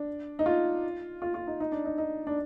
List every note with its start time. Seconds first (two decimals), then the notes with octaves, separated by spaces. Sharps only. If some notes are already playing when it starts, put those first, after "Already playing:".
Already playing: D4
0.39 D#4
0.46 F4
1.22 F4
1.34 F4
1.47 D#4
1.60 D#4
1.72 D4
1.85 D#4
1.98 D#4
2.27 D4